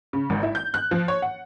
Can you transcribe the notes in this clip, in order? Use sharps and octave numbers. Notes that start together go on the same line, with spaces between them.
C#3
G#1
E4
G6
F#6
F3
C#5
F#5